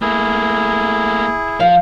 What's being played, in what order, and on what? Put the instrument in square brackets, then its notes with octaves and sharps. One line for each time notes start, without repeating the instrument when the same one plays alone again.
[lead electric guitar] A3 A#3 [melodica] E4 G#4
[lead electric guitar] F3 [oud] F5